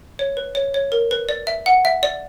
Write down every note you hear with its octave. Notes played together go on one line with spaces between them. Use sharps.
C#5
B4
C#5
C#5
A#4
B4
D5
E5
F#5
E5
D5